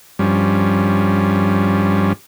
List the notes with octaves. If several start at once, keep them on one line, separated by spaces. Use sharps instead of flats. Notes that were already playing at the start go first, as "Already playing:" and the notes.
G2 F3 G3 C#4